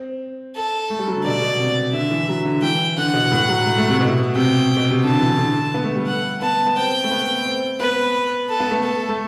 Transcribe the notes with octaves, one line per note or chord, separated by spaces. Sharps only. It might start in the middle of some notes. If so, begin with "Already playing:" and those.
Already playing: C4
A4
A3
G3
F#3
D3
B2 D5
B2
C3
D3 E5
E3
F#3
D3
E3 G5
D3 F#5
B2
A2
F#3
A3
A3
C3
B2
C3 G5
B2
C3
D3 A5
E3
D3
B3
A3
G3
F#5
B3 A5
B3
C4 G5
A3
B3
C4
B3 B4
A4
B3
A3
A4
A3